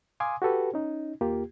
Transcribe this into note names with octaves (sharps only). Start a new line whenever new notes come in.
F5 G#5 C6 D6 D#6
F#4 G4 A4 B4
C#4 D#4
D#2 A#3 F4 G4